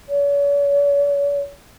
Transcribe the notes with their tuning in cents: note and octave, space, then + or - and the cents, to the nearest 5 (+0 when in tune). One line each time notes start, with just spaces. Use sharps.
C#5 +45